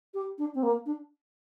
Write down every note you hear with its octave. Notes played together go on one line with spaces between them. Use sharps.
G4
D4
C4
A#3
D4